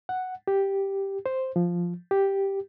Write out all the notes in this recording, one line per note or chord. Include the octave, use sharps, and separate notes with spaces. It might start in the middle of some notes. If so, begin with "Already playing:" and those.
F#5
G4
C5
F3
G4